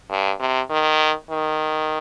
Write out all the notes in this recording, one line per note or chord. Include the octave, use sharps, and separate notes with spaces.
G2
C3
D#3
D#3